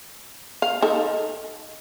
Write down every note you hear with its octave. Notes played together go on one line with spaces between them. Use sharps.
F5
D#4 A4